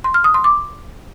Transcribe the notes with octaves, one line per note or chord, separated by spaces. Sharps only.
C6
F6
D#6
C6
D6